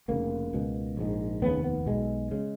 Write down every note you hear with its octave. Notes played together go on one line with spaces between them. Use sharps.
F1 F2 C#3 A#3
C#2 B2
A#1 G#2
F1 D#2 C#3 B3
B3
B1 B2 G#3
C#3 G#3